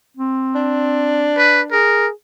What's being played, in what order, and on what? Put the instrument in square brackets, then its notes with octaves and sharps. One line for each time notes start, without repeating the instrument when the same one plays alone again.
[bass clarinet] C4
[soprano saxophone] D4
[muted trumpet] B4
[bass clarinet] G#4 [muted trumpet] A#4